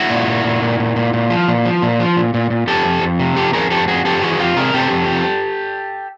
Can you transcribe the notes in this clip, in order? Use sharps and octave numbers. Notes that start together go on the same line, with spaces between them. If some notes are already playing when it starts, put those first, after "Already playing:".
Already playing: E4 F#4
A#2
A#2
A#2
A#2
A#2
A#2
A#2
F3
A#2
F3
A#2
F3
A#2
A#2
A#2
F2 G4 A4
F2
F2
C3
F2 G4 A4
F2 G#4 A#4
F2 G4 A4
F2 F#4 G#4
F2 G4 A4
E3 F#4 G#4
F#4
F2 F4 G4
C3 G#4 A#4
C3 G4 A4
F2
F2